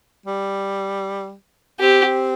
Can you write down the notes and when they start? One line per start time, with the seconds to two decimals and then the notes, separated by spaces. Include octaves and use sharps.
0.26 G3
1.80 C4 G4